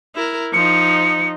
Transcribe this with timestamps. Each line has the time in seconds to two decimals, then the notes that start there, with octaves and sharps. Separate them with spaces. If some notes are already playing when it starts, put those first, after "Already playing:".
0.15 E4 A#4
0.54 F3 D#4 C#7